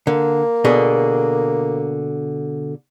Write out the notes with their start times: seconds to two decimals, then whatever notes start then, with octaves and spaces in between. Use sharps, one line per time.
0.07 D3 A#3
0.65 B2 D3 G#4